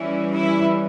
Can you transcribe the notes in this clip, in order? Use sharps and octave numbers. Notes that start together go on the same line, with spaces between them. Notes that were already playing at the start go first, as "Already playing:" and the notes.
Already playing: E3 G3 C#4 E4
E4